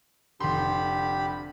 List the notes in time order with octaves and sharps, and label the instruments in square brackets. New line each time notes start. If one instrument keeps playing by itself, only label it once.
[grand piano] F1 C6 [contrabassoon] D3 [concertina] G4 B5